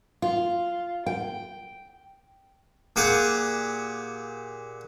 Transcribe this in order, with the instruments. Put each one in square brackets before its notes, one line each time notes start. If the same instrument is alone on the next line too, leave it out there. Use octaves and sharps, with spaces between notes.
[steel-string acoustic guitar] F4
G5
[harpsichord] A#2 G4 G#4 F#5 D6